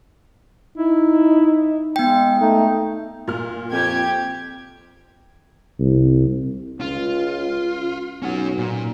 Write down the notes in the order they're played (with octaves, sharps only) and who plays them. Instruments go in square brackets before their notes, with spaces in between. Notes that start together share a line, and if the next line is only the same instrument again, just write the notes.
[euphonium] D#4 [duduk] E4
[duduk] G#3 [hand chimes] B3 G5
[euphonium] A3 [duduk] D#4
[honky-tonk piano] A#2 F6
[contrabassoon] F2 [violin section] G4 G5 G#6
[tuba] C2
[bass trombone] C#2 [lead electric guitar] F4
[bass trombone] B1 [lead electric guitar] C#4 F#5
[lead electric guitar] A#2